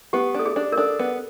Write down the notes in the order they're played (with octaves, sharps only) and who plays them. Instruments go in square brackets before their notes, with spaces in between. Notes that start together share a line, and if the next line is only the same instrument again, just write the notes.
[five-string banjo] B3 [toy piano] G4
[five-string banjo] D4 [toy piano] A4
[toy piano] G#4
[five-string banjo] D4
[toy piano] A#4
[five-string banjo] D4 [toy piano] A4
[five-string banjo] B3